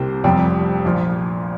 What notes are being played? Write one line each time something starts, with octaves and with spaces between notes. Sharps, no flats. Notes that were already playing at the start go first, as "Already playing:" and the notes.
Already playing: C2 C3 A#3 G4 C5
F1 F2 C3 G3 C4
A#1 A#2 F3